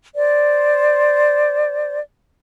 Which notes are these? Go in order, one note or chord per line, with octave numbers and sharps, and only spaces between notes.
C5 D5